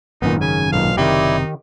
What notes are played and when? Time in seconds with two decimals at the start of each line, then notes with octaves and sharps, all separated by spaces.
0.22 G#1 F#2 A#2 D#3 B3 D#4
0.41 C#3 G#5
0.72 B1 A#2 F5
0.97 F#1 C3 D#3 D#4 E4 G4 D5